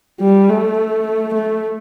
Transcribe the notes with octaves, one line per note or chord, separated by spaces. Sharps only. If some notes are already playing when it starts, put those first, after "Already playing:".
G3
A3
A3